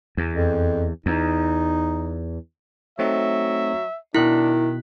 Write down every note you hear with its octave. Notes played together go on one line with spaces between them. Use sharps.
E2
F2
E2 D#4
F#3 A3 C4 D#4 E5
B2 D#3 D4 E4 F#6 B6